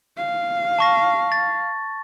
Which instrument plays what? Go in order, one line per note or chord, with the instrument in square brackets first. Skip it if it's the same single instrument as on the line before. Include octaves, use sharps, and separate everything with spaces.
[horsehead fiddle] F5
[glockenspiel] A5 C#6 A#6
A6